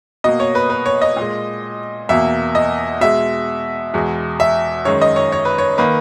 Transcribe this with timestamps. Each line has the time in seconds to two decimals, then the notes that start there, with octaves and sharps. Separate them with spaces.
0.24 B2 A#3 D#5
0.40 C#5
0.55 B4
0.70 B4
0.86 C#5
1.02 D#5
1.16 A#2 G#3
2.09 E2 B2 A#3 E5
2.55 D#5
3.01 B2 G#3 E5
3.94 E2 B2 G#3
4.40 E5
4.85 F#2 D#3 G#3 C#5
5.01 D#5
5.16 C#5
5.32 C#5
5.45 B4
5.58 C#5
5.78 D#3 A#3 B4